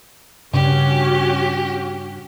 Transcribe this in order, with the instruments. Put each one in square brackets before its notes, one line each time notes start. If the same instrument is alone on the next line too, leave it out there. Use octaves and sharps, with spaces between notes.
[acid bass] G2 [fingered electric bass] C#3 [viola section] C#4 F#4 [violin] G4